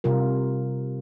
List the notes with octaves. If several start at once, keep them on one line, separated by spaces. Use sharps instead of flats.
C3 G3 F4 A#4